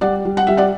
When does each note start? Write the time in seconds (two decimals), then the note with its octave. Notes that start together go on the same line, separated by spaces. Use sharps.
0.01 G3 D5 F#5
0.25 G3
0.37 F#5
0.47 G3 E5
0.57 D5 F#5